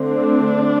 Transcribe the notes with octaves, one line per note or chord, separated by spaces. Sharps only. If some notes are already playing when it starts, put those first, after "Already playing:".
Already playing: D3 A3 C4
D4